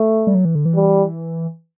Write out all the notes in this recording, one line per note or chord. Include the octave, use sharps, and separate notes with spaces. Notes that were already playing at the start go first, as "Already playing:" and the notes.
Already playing: A3
G3
F#3
E3
D3
E3
G3